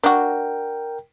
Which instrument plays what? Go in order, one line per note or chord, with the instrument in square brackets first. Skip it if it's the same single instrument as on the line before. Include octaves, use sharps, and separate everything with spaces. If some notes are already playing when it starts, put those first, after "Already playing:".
[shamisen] D4 F#4 [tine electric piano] A#4 G5